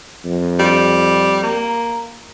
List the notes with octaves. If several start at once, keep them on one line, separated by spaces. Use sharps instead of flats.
F2
G3
A#3